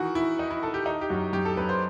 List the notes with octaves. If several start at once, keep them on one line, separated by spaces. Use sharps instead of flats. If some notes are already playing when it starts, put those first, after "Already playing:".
Already playing: D#3 E3 F#4
D#3 E4
D#3 D#4
E4
D#3 A4
G4
D#3 D#4
G4
F#2 F#4
F#2 G4
A4
F#2 B4
C5